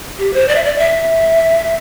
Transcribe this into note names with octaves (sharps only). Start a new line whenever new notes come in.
G4
C5
D5
E5
D5
E5